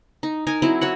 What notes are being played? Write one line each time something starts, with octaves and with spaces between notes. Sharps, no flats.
D#4
D#4 A#4 G#5
F#3 C4 E4
F#4 C#5 F#5